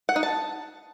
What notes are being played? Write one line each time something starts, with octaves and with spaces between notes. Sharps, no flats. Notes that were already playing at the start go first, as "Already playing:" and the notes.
F#5
D#4
A5